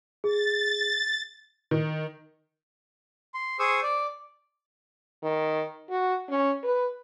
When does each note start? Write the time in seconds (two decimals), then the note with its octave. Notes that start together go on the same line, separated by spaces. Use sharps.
0.24 G#4 A6
1.71 D#3
3.34 C6
3.59 G#4 C5 C#6 D#6 E6
3.83 D5
5.23 D#3
5.90 F#4
6.30 C#4
6.64 B4